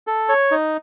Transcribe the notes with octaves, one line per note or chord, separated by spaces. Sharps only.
A4
C#5
D#4